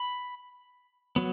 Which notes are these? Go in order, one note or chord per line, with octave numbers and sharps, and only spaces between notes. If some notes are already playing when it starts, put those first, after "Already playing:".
Already playing: B5
F#3 B3